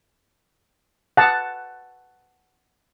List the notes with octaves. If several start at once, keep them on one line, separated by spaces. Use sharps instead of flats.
F#5 A5